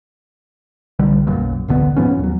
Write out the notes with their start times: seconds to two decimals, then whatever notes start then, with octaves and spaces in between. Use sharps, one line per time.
0.99 B1 D3 G3
1.27 F#1 B1 F#2 A#2
1.68 D1 A1 D3 B3
1.96 G#2 F3 B3 C#4
2.19 D#2 F#3